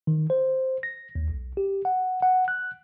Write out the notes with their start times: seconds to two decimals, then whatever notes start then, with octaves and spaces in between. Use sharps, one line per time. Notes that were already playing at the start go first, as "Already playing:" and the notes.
0.07 D#3
0.30 C5
0.83 A#6
1.15 D#2
1.29 B1
1.57 G4
1.85 F#5
2.22 F#5
2.48 F#6